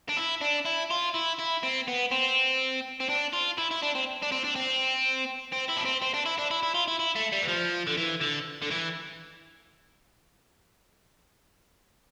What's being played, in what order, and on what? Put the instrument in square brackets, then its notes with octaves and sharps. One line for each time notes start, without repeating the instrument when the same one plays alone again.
[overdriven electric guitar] D4
E4
D4
E4
F4
E4
E4
C4
B3
C4
C4
D4
F4
E4
E4
D4
C4
D4
C4
D4
C4
C4
E4
D4
C4
C4
D4
E4
D4
E4
E4
F4
E4
E4
A3
G3
E3
F3
D3
E3
D3
D3
E3